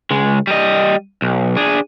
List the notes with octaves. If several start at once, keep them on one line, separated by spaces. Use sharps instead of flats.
C#2 G#3
G3 D#5
B1
D4 G#4